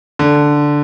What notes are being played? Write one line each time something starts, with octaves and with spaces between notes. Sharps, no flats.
D3